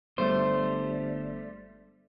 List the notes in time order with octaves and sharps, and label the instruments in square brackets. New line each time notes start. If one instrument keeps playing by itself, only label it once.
[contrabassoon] G1 [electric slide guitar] G3 A3 [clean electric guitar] C5